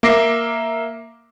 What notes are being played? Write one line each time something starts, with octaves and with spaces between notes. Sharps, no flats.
A#3 E5 D6 A#6 C7